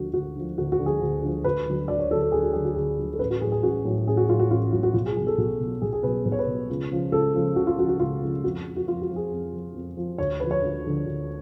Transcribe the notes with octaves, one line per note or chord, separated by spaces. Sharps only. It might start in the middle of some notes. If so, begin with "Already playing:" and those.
Already playing: D2 D3 F3 F#4
D2 F#4
D3 F3
D2 F#4
F#4
D3 F3
G#4
D2
D3 F3
D2 B4
D3 F#3
D2 D5
C#5
D3 F#3 A4
A4
D2 G#4
F#4
D3 F#3 G#4
F#4
D2 G#4
D3 F#3
A4
A1 B4
F#4
A2 F#3 G#4
G#4
A1 F#4
A2 F#3
A1 G#4
F#4
A2 F#3 F4
F#4
A1 F4
A2 F#3 F4
F#4
B1 F4
G#4
B2 F#3 G#4
A4
B1 F#4
B2 F#3
B1 G#4
G#4
B2 F#3 B4
B1 B4
C#5
B4
B2 F#3
C#2
C#3 F3
C#2 A4
C#3 F3
C#2 F#4
F4
C#3 F3 F#4
F#4
C#2 F4
C#3 F3
F2 F#4
F3
F#4
F2 F4
F#4
F3
G#4
F2
F3
F2
F3
D2 C#5
D3 F3 B4
C#5
D2
D3 F3
D2